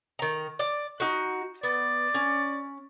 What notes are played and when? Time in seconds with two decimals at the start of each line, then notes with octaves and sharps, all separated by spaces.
0.19 D#3 A#5
0.59 D5
1.00 D#4 F#4
1.63 B3 D5
2.14 C#4